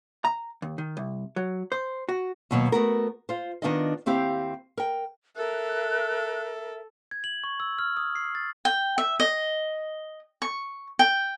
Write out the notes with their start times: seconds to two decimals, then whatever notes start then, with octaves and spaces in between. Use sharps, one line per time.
0.25 A#5
0.62 D#2
0.78 D#3
0.97 C2
1.36 F#3
1.72 C5
2.09 F#4
2.51 D#2 B2 F#3
2.72 A3 B3 F#4 A#4
3.29 F4 C5
3.62 D#3 B3 D4 D#4 F4 D#5
4.06 D#2 C4 E4 G4 F5
4.77 A#4 G5
5.37 A4 A#4 E5 F#6
7.11 G#6
7.24 F#7
7.44 C#6
7.60 E6
7.79 F6
7.97 D#6
8.15 C7
8.35 A6
8.65 G5
8.98 E5
9.20 D#5
10.42 C#6
10.99 G5